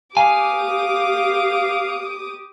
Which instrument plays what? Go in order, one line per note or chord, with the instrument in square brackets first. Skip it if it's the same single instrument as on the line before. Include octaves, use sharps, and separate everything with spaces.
[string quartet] G4 D6 D#6 [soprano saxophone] F5 [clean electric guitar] G#5